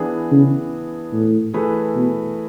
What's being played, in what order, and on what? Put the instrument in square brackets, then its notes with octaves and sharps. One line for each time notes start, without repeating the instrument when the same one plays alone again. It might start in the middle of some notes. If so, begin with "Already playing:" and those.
Already playing: [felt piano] E3 B3 D4 G#4
[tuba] C#3
A2
[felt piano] E3 A3 E4 G#4 B4
[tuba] B2